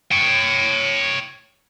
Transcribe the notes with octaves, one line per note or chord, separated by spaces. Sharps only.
C#5 G5